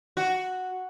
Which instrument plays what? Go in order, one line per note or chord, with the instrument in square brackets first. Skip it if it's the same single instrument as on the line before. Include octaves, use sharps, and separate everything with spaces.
[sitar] F#4